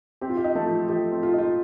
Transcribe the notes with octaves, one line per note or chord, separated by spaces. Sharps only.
C4 G4
F4
G4
D#4
A3 A4
F3
F3 G4
C4
F4
D#4 F4